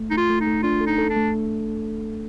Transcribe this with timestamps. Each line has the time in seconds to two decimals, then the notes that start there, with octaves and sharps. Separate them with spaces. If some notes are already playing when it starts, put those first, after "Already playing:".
Already playing: A3
0.11 A3 D#4
0.17 F4
0.29 A3
0.41 D#4
0.47 A3
0.63 D4 F4
0.81 A4
0.87 D#4
0.98 A4
1.10 D4
1.16 A3